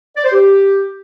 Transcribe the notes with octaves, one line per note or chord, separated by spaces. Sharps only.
D5
C5
G4